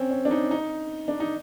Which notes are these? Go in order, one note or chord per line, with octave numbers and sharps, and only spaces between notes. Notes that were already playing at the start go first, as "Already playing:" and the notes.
Already playing: C4 C#4
C#4
D4
D#4
D#4
D4
D#4